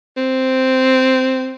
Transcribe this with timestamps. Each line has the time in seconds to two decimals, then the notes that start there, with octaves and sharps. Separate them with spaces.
0.17 C4